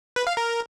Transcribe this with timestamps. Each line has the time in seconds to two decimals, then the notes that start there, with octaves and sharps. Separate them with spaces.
0.16 B4
0.27 F5
0.37 A#4